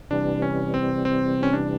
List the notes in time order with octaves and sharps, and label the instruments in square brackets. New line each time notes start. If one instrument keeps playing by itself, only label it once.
[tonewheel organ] C3 E3 G3 [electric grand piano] D4
[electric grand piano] C#4
C4
C4
C#4
D4